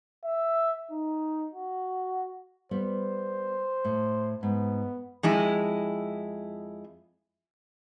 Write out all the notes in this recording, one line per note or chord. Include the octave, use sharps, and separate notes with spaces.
E5
D#4
F#4
G3 B3 C5
A2
G#2 B3
F2 G#3 E4